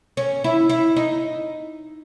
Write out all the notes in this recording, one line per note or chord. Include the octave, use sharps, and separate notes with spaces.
C#4
E4
E4
D#4